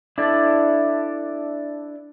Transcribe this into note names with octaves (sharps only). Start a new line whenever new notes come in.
D4 E4 A4 D5